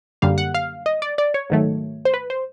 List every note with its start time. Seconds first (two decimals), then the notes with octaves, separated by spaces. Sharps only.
0.22 F#2 D3 G3 A#3 F5
0.38 F#5
0.54 F5
0.86 D#5
1.02 D5
1.18 D5
1.34 C#5
1.50 G#2 D#3 F#3 A3
2.05 C5
2.14 B4
2.30 C5